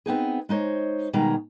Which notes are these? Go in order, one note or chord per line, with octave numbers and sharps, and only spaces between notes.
B3 C4 D#4 G#4
G#3 D#4 C5 C#5
B2 D#3 G3 G#3 G#4 A#5